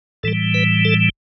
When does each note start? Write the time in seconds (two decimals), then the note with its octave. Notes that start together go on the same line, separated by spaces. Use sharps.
0.23 A2 E3 G3 A4
0.54 B4
0.85 A4